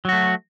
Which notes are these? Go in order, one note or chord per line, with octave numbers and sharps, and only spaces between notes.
F#3 A3 F#4